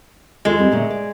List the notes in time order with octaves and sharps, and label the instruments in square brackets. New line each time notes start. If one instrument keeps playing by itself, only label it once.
[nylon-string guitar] D#2 F4 A4 [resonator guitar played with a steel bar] G#3
[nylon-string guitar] G3 C4
A#2 D3 A3
D5